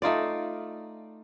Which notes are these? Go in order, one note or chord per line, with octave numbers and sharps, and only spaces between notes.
A3 D#4 F4 D5